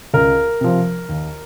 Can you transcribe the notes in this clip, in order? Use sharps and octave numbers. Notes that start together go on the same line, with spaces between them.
C#2 A#4
C3 F3
D#2